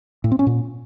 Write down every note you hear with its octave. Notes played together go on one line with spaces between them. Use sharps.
A2
C4
C#4
A#2